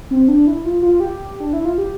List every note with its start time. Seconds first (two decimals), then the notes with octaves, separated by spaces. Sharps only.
0.11 C4
0.28 D4
0.47 E4
0.65 F4
0.82 F4
1.00 G4
1.40 D4
1.53 E4
1.65 F4
1.78 G4